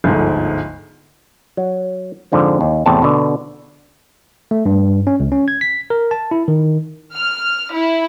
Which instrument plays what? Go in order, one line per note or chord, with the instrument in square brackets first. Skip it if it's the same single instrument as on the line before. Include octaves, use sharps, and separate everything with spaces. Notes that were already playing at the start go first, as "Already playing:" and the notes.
[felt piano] G1 D2 G#2 F3
[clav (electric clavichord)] F#3
F2 G#2 D3 F3
D#2
E2 A2 C3 G5 A5
B2 D3
[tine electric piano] A3
G2
C#4
C#2
C#4
G#6
B6
A#4
A5
E4
D#3
[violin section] F6
E4